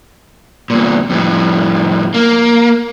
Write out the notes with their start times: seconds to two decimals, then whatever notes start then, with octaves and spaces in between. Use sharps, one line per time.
0.70 E2 A#2
1.10 F2 A2
2.14 A#3